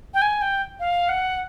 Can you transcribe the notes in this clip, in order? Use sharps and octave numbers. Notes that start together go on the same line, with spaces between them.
G5
G#5
G5
F5
F#5